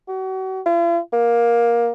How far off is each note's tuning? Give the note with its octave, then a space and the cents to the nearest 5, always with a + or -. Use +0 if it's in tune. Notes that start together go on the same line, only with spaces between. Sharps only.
F#4 +35
F4 -45
A#3 +15